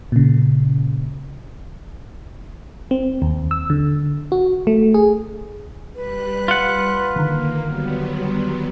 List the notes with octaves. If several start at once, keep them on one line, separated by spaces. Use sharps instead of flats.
A#2 C#3
C4
D#2
E6
D3
F#4
A3
G#4
G3 B4 F#6
F4 F#5
D3 D#3 A#3 A#5
F#3 G3 B3